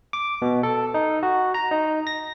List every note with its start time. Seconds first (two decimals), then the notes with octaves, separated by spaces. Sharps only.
0.13 D6
0.42 B2
0.63 A4
0.94 D#4
1.23 F#4
1.54 A#5
1.71 D#4
2.07 A#6